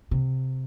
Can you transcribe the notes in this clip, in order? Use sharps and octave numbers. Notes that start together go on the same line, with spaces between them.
C3